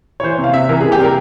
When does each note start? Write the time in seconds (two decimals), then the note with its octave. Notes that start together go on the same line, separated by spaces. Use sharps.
0.20 C#5
0.23 E3 C5
0.38 C3
0.44 F5
0.53 C3 E5
0.69 E3 A#4
0.81 G#4
0.84 C3
0.92 G4
0.98 G3 A#4